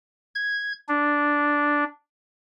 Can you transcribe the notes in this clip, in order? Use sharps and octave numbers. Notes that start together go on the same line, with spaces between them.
G#6
D4